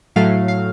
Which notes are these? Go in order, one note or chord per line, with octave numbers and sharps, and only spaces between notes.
A2 F#3 A3 F5
F5